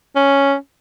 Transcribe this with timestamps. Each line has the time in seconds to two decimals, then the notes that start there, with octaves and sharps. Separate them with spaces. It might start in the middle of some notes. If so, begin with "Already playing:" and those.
0.16 C#4